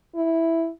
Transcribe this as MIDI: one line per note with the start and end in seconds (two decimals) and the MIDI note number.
0.15 0.70 64